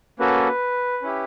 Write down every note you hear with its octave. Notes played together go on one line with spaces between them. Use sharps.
A#3 C#4 F#4 A4 B4
C#4 E4 G4